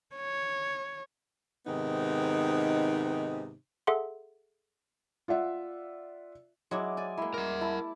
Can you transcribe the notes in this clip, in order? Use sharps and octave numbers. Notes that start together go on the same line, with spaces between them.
C#5
G#2 C3 D#3 B3 D#4
G#4 A4 E5 F#5 C6
F4 D5 E5 F#5
F#3 G#3 E4 D6
D5 G#5
G#3 A#3 E4
A#4 D5 F#5
E4 A5 B5